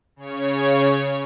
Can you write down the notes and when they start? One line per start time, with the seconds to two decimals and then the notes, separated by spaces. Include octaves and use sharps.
0.16 C#3 C#5